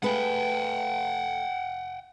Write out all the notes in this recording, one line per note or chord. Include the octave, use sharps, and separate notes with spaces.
A3 G#4 B4 F#5 G5